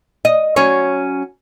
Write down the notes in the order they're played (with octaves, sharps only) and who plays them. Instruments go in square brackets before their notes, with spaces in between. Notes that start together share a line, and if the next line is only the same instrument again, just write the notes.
[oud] D#5
F#3 C#4 C#5